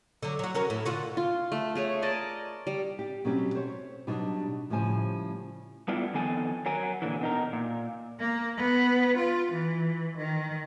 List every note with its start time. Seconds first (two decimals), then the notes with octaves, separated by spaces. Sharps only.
0.23 D3 F#3
0.39 F#3 F#4
0.55 C#4 F#4 A#4
0.70 A2
0.86 D3 F4 F#4
1.17 F4
1.52 A3
1.75 A3 G#4 C#5
2.02 A#4 D5 D#5 A5
2.67 G3
2.99 G4
3.25 B2 F#3 G3 C4 C#4 G4
3.55 C5 C#5
4.07 B2 F#3 G3 D4 D#4
4.70 A2 C#3 F3 G3 C5 G#5
5.88 G3 A3 B3 D4 E4 F4
6.14 F2 D#3 B3 A4 G#5
6.66 F#3 A#4 G#5
7.02 A#2 D3 E3
7.21 B2 D#4 A#4
7.53 A#2
8.20 A#3
8.57 B3
9.17 F4
9.52 E3
10.17 D#3